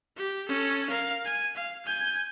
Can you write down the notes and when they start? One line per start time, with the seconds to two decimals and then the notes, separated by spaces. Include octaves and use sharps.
0.16 G4
0.48 C#4 A4
0.89 A#4 F5
1.25 G#5
1.56 F5
1.86 G#5 G6